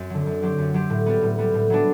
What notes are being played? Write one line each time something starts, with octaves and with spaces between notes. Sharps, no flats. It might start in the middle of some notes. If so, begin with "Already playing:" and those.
Already playing: F#2 C4
D3 F#3
F#2
F#3 C4 G4
F#2
F#3 C4 G4
A2
G3 B3
A2
G3 B3
A2
F#3 B3 D4